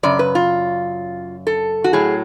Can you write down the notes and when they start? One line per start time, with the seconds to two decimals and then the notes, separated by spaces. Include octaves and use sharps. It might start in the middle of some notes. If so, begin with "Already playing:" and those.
0.03 F#2 C#3 D5
0.19 B4
0.35 F4
1.47 A4
1.84 F#4
1.93 A2 F#3 G#4